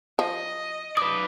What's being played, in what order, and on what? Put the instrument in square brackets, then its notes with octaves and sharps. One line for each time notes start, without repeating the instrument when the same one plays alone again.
[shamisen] F3 [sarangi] D#5
[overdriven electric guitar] B4 D5 [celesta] D#6